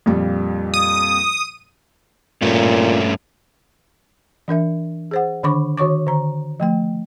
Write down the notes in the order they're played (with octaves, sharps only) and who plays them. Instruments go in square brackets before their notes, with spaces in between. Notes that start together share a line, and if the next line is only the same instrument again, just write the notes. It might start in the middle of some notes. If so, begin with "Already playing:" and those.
[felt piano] F2 A#2 G3
[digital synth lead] D#6
[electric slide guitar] G2 A3 C#4 [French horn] A#2
[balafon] E3 D4 A#4 E5
G#4 C5 F#5
D3 D#3 D4 B5 C#6 D6
D#3 F#4 C#5 C#6 D6
D3 A#5
F3 A3 G5